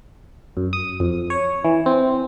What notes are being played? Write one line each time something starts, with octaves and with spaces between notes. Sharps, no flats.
F#2
D#6
F2
C#5
E3
C4